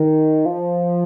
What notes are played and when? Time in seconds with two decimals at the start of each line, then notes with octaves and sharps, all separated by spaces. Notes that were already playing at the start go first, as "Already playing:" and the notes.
Already playing: D#3
0.46 F3